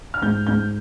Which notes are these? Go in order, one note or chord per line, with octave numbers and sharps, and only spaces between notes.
F6
G#2 G6
G#2 G6